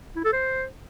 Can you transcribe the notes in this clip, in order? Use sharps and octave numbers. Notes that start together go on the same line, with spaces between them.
E4
A4
C5